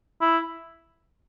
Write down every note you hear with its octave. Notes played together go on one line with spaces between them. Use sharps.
E4